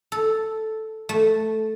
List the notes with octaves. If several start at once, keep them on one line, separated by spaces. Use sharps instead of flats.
A4
A3